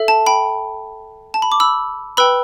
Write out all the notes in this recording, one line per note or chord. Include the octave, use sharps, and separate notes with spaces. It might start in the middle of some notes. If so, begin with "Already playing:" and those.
Already playing: A4 E5
A5
G5 B5
A5
B5
D6
B5 E6
B4 G5 B5 E6